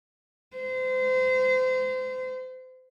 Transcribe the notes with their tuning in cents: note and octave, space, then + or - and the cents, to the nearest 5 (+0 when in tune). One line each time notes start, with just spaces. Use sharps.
C5 -30